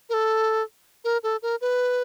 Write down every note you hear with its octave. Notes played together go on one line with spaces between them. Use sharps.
A#4
A4
A#4
A4
A#4
B4